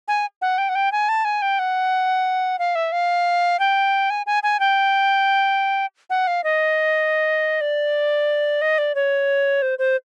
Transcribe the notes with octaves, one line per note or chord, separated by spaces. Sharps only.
G#5
F#5
G5
F#5
G5
G#5
A5
G#5
G5
F#5
F5
E5
F5
G5
G#5
G#5
G#5
G5
F#5
F5
D#5
D5
D#5
D5
C#5
C5
C5